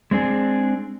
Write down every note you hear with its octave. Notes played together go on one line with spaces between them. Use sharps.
G#3 C4 D4 G#4